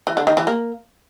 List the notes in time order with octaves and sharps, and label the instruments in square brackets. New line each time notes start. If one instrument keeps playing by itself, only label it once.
[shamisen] E3
D3
D#3
E3
A#3